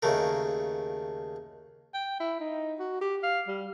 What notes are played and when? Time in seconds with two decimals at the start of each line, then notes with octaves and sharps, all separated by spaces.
0.03 D#2 C#3 A3 A#4
1.94 G5
2.20 E4
2.40 D#4
2.79 F#4
3.01 G4
3.23 F5
3.47 G3